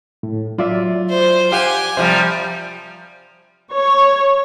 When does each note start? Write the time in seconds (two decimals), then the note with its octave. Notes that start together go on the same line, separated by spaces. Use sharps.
0.23 A2
0.58 F#3 F4 D5 E5
1.09 C5
1.52 G4 F5 F#5 G#5
1.97 C3 F3 G3 C5 E5
3.74 C#5